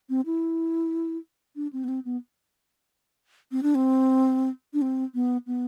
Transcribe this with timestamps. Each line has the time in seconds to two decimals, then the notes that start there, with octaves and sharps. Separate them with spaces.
0.10 C4
0.26 E4
1.56 D4
1.73 C4
1.84 B3
1.88 C4
2.05 B3
3.52 C4
3.63 D4
3.75 C4
4.74 D4
4.82 C4
5.15 B3
5.47 B3